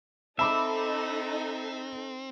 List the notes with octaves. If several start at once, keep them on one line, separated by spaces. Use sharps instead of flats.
C4 D#4 A4 E5 A5 B5 D6